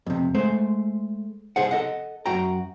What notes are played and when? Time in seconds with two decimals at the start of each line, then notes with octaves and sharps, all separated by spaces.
0.06 F2 C3
0.34 G#3 A3 C5
1.56 C2 G#4 C5 F#5
1.71 A4 D#5 F#5
2.26 F#2 F#4 G5 A#5